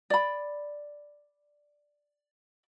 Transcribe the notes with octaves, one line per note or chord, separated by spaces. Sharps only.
D5 B5